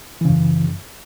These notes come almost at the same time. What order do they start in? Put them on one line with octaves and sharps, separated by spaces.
E3 C#3 F#2